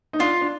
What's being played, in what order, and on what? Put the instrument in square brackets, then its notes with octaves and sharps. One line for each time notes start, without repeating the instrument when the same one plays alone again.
[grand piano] D#4
[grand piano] D4 [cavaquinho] F4
[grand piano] D4